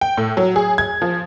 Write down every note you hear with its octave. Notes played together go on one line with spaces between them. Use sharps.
G5
A2
F#3
G#4
G#6
F3